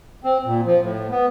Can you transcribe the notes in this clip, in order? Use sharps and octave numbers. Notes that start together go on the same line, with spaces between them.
C4
A#2
F3
A2
B3